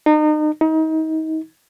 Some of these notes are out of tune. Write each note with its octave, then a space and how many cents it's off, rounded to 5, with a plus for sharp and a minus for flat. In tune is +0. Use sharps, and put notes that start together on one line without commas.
D#4 -35
D#4 +30